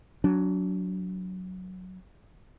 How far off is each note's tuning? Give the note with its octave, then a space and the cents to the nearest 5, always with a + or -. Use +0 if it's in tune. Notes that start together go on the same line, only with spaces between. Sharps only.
F#3 +0 D4 -30